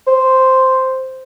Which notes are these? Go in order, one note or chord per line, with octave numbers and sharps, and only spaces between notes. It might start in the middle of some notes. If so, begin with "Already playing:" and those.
C5